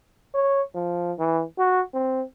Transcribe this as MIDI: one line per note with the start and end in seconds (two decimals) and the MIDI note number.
0.34 0.62 73
0.75 1.12 53
1.19 1.43 52
1.58 1.81 66
1.94 2.22 60